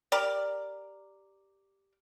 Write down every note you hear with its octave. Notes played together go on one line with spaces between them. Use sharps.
G4 A#4 D5